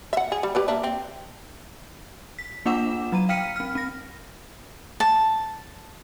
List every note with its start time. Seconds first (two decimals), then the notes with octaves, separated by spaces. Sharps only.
0.13 E5 F#5
0.32 G#4
0.43 G3
0.55 G4 B4 D5
0.68 A#3 D4 E5
0.83 C4
2.39 B6
2.66 A#3 D4 F4 F#5 D6 E7
3.12 F#3 A#5 D#7
3.29 F5 G5 F6 B6 C#7 D#7
3.56 C4 F6
3.75 C4 A#6
5.00 A5